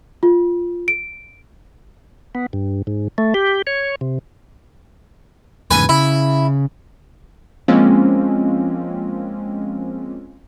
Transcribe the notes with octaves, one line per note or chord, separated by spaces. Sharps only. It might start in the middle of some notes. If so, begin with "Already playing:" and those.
F4
D7
B3
G2
G#2
A3
G4
C#5
C3
E2 G#2 C#3 B4 G#5
C#3 E4
F3 G#3 A#3 C4 C#4 F4